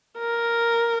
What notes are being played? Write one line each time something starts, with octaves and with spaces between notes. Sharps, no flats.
A#4